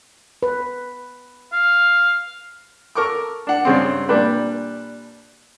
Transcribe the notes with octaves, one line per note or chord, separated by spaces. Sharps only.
B4
F5
A4 A#4 C#6 D6
D4 F#5
G2 C#3 C4
A#2 G3 D4 B4